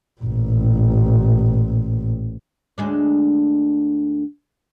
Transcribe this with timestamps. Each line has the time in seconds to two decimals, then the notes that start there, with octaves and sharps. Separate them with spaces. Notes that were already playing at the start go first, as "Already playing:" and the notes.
0.21 A1 A#2
2.78 D2 G#3 D4